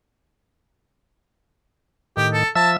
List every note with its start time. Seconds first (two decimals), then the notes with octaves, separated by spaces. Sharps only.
2.17 A2 D#3 G4
2.33 A4
2.55 F3 E5 A5 E6